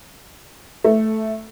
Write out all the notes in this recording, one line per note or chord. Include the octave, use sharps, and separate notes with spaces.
A3